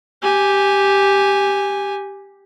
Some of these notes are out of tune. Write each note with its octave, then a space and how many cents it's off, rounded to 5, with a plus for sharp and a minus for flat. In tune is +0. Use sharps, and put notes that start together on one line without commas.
G4 +0 G#5 -10